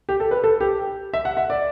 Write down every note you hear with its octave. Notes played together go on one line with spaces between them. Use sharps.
G4
A4
B4
A4
G4
E5
F#5
E5
D5